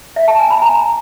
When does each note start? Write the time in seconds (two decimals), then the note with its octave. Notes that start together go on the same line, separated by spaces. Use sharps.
0.16 E5
0.28 A5
0.39 G#5
0.51 B5
0.62 A#5